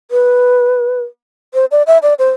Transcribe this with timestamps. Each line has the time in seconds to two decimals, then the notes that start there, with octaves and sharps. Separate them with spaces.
0.11 B4
1.54 C5
1.71 D5
1.87 E5
2.03 D5
2.19 C5